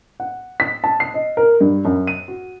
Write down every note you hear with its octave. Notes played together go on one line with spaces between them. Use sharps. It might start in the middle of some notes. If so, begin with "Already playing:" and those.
F#5
B6
A5
C7
D#5
A#4
G2
F#2
D#7
F#4